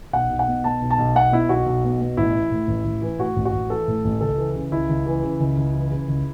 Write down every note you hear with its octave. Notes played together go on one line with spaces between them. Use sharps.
B1 F#5
B1
F#5
B2
B2 A5
B1
A5
B1
B2 F#5
B2 E4
B1 F#4
B1
B2
B2
A1 E4
E3
A2
A1
A1
E3
A2 F#4
A1
F#4
A1
E3 A4
A2
A1
C#2 A4
E3
C#3
C#2 E4
C#2
E3
C#3
C#2
C#2
E3
C#3
C#2